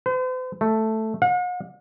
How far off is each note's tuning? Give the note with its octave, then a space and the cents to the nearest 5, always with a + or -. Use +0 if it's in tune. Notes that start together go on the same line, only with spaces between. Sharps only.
C5 -45
A3 +0
F#5 -45